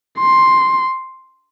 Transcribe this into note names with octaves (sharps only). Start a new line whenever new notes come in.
C6